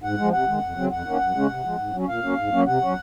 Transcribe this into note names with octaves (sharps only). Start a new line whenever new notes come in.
G#2 F#5
F3 G#3
C3 F#5
D#3 G#3
F2
C#3 F#3 C4
F2 F#5
D#3 A#3 C#4
F#2
C#3 G#3 C#4
C3
F3 G#3
G#2
F#3 C#4
A#2 F5
F#3 A#3 C#4
G#2
F#3 A#3 C#4
C3 F#5
F#3 C#4